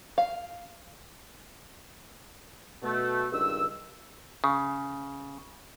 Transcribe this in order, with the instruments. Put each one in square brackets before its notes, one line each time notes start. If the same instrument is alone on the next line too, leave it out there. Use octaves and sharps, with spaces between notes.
[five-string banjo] F5
[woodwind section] B2 A3
C#2 G2 D#3 E6
[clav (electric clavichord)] C#3